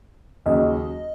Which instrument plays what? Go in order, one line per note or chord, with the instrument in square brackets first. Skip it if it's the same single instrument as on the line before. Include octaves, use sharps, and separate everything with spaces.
[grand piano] D#2 C#3 F#3 [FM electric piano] D#5